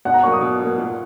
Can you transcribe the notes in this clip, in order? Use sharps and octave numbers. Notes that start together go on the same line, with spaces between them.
B2 F#5
A#5
F#3 A#3 C#6
D#6
B2
F#3 A#3
A#2